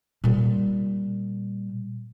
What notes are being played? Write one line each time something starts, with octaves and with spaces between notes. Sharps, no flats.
A#2 G3